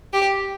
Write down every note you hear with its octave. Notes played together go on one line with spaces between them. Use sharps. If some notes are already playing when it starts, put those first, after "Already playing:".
G4